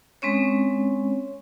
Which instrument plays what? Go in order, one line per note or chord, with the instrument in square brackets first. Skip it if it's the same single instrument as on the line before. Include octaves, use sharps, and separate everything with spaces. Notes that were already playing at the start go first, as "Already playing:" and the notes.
[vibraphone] G#3 C4 C#4 C#5